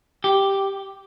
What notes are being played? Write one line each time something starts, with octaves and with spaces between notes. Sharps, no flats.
G4